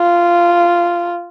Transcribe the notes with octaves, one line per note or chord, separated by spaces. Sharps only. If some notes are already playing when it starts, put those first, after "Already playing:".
Already playing: F4